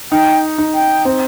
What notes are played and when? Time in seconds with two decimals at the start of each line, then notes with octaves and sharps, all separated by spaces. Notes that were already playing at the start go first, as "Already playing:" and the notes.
0.12 D#4 G5
0.58 D#4
0.74 G5
1.05 C4